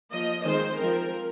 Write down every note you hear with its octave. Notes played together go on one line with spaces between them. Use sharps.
F3 A#3 D#5
D#3 G#3 C4 C5
F3 C4 A#4